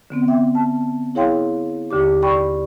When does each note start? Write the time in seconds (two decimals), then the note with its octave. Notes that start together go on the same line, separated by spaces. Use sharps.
0.10 D3 B3 C4
0.28 E5 G5
0.55 A5
1.15 E4 G#4 C#5 F5 G5 C6
1.91 D#2 D3 G4 D6
2.22 D5 G5 B5 C#6